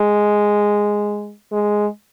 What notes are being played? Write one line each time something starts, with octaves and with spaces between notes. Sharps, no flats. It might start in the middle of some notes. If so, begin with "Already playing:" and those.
Already playing: G#3
G#3